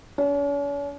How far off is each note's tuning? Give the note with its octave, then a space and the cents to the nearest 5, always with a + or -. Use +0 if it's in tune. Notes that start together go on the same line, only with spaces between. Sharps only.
C#4 +45